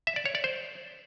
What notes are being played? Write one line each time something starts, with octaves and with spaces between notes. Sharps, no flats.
E5
D5
C#5
D5
C5